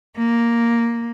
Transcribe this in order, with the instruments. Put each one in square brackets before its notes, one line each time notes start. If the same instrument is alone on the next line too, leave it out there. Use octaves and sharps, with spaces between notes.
[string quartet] A#3